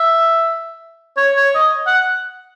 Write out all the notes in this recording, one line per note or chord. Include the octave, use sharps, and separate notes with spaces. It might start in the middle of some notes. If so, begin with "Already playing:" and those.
Already playing: E5
C#5
C#5
D#5
F#5